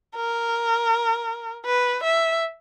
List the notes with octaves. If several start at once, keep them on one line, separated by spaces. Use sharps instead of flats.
A#4
B4
E5